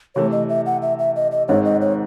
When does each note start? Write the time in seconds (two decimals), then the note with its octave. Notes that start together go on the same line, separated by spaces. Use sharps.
0.15 C3 E3 A3 C#5
0.32 D#5
0.49 E5
0.66 F#5
0.82 E5
0.99 E5
1.16 D#5
1.31 D#5
1.48 G#1 G#2 D#3 G#3 C4 C#5
1.65 D#5
1.81 C#5